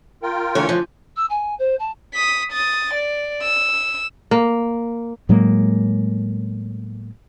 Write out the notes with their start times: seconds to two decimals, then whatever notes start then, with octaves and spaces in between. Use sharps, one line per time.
0.23 F4 A#4 G5
0.55 D3 E3 A3 C#5
0.69 F3
1.16 E6
1.29 G#5
1.58 C5
1.79 A5
2.14 D#6 B6
2.52 D#6 A6
2.94 D5
3.42 E6
4.31 A#3
5.29 A2 F#3 G#3 A#3